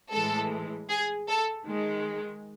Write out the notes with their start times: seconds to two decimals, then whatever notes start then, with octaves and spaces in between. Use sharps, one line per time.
0.12 A2 E3 G#3 A4
0.89 G#4
1.28 A4
1.65 D#3 G#3